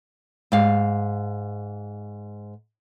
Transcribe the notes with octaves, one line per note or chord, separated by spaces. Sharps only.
G#2 F5